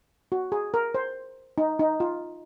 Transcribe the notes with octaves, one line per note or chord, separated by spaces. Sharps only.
F#4
G#4
A#4
C5
D#4
D#4
F4